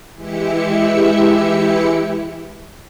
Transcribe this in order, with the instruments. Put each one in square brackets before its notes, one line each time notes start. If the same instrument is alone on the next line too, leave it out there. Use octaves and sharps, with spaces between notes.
[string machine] E3 G#3 E4 G4 E5 C#7